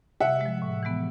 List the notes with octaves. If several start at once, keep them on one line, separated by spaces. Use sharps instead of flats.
C3 E5 F#5
F3 G#3
A2
E3 G#3 B3